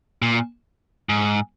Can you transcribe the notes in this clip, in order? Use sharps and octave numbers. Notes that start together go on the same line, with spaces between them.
A#2
G#2